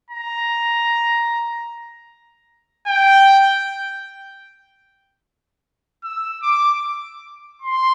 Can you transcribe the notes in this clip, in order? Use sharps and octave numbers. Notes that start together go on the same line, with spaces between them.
A#5
G5
E6
D6
C6